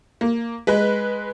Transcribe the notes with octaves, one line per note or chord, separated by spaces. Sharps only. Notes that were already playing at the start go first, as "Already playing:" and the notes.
A#3
G#3 B4